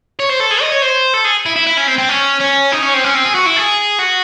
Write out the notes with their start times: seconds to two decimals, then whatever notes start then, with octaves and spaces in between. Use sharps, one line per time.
0.19 C#5
0.29 C5
0.40 A4
0.51 G#4
0.61 D#5
0.72 C#5
0.82 C5
1.14 A4
1.25 G#4
1.46 E4
1.56 E4
1.67 E4
1.77 C#4
1.87 C4
1.98 C4
2.09 C#4
2.41 C#4
2.72 D#4
2.83 C#4
2.94 C4
3.04 C#4
3.15 C4
3.25 G#4
3.35 F#4
3.46 E4
3.57 G#4
3.99 F#4